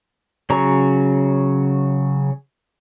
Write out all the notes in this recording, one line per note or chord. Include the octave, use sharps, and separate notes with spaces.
C#3 F#3 C#5 A#5